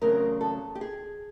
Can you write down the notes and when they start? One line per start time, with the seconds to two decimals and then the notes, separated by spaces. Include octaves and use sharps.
0.01 E2 C#3 F#3 A3 C4 A#4
0.41 A4
0.75 G4
0.81 G#4